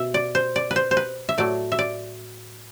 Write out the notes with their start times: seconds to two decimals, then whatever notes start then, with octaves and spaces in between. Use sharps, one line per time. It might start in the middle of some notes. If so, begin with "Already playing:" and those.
Already playing: B2 E5
0.14 D5
0.35 C5
0.56 D5
0.71 B4
0.76 C5
0.91 C5
0.97 B4
1.29 E5
1.38 A2 F#3 A3 D5
1.72 E5
1.79 D5